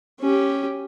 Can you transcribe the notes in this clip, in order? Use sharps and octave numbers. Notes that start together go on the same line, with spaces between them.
C#4 G4